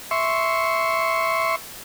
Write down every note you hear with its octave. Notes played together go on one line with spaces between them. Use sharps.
E5 C6 C#6